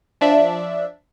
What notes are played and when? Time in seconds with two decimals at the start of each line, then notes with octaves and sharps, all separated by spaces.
0.21 F3 D4 D5 E5